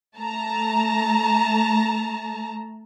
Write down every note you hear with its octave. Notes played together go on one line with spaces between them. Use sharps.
A3 A5 A#5